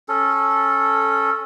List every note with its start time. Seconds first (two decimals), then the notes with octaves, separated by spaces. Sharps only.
0.08 C#4 A4